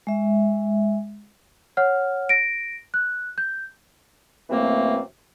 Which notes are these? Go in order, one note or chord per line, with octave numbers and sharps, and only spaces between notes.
G#3 E5
C#5 F#5 F6
A#6 D7
F#6
G6
F#2 C3 E3 A3 A#3 C4